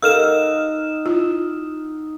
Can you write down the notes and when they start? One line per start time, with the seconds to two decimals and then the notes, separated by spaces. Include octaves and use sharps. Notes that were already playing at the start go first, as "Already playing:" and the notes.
0.02 D#4 A4 A#4 F5 F#5 E6 F6 E7
1.06 E4 F4